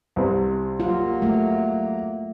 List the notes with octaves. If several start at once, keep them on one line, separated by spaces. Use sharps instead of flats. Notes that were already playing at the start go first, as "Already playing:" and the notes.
C2 C3
F#3 A#3 F4
A3